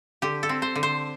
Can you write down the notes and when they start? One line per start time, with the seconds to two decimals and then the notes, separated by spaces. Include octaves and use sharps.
0.22 D3 G4
0.43 A4
0.49 C4
0.62 C5
0.76 D3
0.83 C5